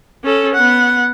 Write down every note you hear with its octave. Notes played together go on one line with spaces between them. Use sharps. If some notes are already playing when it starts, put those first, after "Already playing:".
C#4 A4
B3 F#5